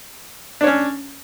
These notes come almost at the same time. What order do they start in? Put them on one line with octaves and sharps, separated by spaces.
D4 C#5 C#4